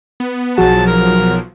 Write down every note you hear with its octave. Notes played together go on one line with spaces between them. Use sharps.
B3
B1 F3 F#3 F#4 G#4 F#5 A5
A#4